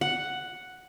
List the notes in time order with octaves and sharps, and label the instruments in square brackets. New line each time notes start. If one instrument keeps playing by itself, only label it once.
[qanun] F#5